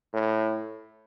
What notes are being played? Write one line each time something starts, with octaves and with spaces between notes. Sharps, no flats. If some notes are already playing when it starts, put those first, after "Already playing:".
A2